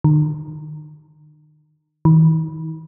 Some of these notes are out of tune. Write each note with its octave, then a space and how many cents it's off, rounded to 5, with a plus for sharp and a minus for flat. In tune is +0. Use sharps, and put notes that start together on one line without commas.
D#3 -40
D#3 +45